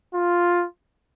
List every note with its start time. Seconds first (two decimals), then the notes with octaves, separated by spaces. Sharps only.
0.14 F4